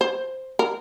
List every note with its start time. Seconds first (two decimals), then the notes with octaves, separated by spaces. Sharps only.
0.01 C5
0.59 A#4